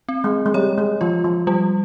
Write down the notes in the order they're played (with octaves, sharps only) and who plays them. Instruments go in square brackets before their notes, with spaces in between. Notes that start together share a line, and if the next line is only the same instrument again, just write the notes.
[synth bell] C4
[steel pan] G#3
G#3
[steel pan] G3 [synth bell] C#5
[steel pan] G#3
[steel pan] F3 [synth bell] F4
[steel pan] F3
[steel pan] F3 [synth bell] G3